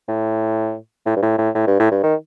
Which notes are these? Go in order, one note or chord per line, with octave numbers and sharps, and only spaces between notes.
A2
A2
G2
A2
A2
A2
G2
A2
G2
D#3